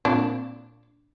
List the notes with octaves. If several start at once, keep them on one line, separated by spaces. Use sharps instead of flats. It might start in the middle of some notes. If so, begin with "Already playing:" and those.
A#2 A#3 C4 D4